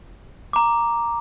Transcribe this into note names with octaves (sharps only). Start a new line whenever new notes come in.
A#5 D6